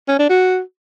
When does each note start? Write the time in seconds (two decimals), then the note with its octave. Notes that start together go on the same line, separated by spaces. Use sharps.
0.08 C#4
0.19 D4
0.30 F#4